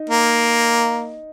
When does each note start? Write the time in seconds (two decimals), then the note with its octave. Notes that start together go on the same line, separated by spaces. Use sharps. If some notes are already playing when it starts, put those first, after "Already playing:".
Already playing: D#4
0.10 A#3